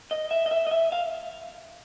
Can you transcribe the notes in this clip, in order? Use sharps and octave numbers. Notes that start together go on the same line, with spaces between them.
D#5
E5
D#5
E5
D#5
E5
F5